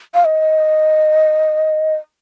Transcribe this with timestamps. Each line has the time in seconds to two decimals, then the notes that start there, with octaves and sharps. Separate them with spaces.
0.14 F5
0.25 D#5